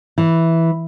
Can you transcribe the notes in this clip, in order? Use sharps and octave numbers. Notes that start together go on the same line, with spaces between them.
E3